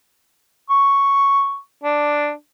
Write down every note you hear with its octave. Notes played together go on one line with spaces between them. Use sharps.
C#6
D4